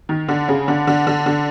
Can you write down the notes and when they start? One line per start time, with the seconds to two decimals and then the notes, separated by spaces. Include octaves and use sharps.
0.09 D#3
0.28 D3
0.48 C#3
0.68 D3
0.87 D3
1.07 D3
1.26 D3